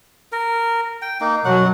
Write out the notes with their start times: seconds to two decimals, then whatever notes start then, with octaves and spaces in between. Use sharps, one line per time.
0.32 A#4
1.02 G5
1.21 A#3 D#4
1.45 F#2 B2 F#3 F#5